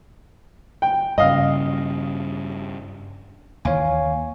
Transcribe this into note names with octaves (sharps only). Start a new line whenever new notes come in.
G5
G2 C#3 D#5 F5
D#2 E3 C#5 F5 G#5